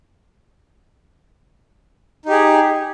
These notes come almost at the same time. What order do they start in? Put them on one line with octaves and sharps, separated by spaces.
D#4 G4 G#4